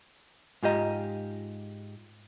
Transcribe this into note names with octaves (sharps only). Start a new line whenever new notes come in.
G#2 F4 G4 D#5 A#5